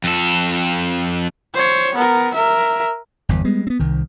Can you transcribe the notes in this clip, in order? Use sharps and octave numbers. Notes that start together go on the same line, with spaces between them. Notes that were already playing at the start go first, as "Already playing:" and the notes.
F2 A4
C5 C#5
B3 A#4
A#4 E5
G1 E2
G3 G#3 B3
B3 C4
C2 D#3